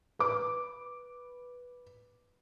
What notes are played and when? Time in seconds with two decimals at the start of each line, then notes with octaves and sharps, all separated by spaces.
0.19 B4 D6